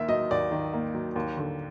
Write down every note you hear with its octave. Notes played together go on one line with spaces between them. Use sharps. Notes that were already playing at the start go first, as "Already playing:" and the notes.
Already playing: D#2 D#3 A#3 E5
F#3 D#5
D#2 D5
D#3
A#3
F#3
D#2
D3